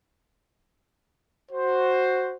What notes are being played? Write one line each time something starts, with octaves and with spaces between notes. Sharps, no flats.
F#4 C5